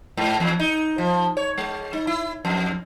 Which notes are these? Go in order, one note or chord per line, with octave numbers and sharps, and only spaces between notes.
G#2
E2
D#4
F3
C#5
G#3
D#4
E4
F2